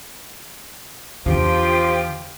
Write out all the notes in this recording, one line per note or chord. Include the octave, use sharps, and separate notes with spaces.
E2 D3 F3 F4 G4 C5 G5